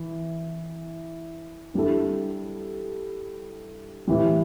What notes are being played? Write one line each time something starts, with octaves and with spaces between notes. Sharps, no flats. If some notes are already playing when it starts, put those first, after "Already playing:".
Already playing: E3
D3 G3 E4 A4
A2 E3 G3